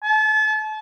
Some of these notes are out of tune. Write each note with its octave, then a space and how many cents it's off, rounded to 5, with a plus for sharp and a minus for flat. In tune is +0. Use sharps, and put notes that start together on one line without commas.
A5 -35